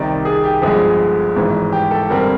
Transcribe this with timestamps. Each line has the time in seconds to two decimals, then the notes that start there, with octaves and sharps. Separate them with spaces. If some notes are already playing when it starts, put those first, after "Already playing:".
Already playing: C2 C3 D#3 D5
0.25 G#4
0.44 G4
0.62 G1 G2 D3 F3 G#3 G#4
1.36 G#1 G#2 E3
1.72 G4
1.91 A4
2.10 G2 D3 G3 C4 A#4